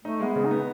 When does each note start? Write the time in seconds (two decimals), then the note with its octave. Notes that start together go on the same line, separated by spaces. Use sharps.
0.05 A3 D#4
0.20 G#3
0.25 B3
0.36 C#3
0.45 D#4
0.51 B3